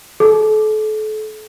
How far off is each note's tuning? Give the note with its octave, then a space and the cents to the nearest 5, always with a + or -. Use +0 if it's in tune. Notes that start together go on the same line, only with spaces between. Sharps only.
A4 -35